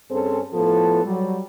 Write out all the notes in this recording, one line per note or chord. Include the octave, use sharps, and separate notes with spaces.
G2 C4 C#4 G#4 A4 C5
A2 F3 B3 A4
F#3 G3